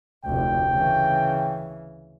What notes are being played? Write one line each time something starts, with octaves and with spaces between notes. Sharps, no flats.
F1 D2 G5
C#3 E3